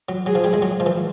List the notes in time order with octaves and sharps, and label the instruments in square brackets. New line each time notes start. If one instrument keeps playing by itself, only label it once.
[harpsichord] F#3
[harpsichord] F#3 [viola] G#4
[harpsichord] F3
G3
G#3
F#3
F3
E3